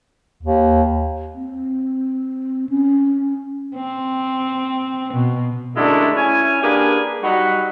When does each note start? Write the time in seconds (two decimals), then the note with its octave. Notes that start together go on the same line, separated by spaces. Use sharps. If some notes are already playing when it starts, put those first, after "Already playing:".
0.43 D#2
1.35 C4
2.69 C#4
3.75 C4
5.14 B2
5.75 F#2 D3 G#3 A3 D4 E4
6.16 C#4 E4 C#5 G#5
6.61 A#3 D4 G4 G#4 A#4 B4
7.22 F#3 G3 D#4 F#4 F#5 B5